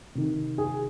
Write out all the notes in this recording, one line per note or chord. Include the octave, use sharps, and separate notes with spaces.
C3 D#3
G#4